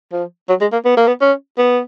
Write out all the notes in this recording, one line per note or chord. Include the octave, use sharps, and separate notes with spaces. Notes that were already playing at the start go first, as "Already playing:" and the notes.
F3
F#3
G#3
A#3
B3
A#3
B3
C#4
B3